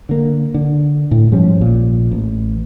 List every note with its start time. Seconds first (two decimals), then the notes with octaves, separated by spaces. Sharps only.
0.09 D3 A#3
0.54 D3
1.11 A2
1.32 G#2 F3 G3 C#4
1.59 A#1 A#2
2.11 A1